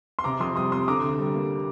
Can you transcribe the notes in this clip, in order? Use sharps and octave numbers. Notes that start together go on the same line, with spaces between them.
C6
C3 A#5 D6
F2 C6 D#6
G3 C6 D#6
C4 C6 D#6
D3 A#5 D6
D2
G3
A#3